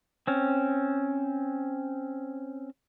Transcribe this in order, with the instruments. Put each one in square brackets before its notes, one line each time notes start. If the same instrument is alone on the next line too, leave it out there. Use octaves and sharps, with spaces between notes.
[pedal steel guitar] C4 C#4